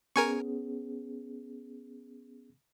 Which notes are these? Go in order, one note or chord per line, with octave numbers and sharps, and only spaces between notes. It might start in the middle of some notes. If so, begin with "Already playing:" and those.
B3 C#4 G#4 A#4 G#5 C#6